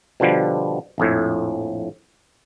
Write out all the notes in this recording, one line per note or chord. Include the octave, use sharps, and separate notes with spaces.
B2 D3 F3 G3
A#1 F2 A2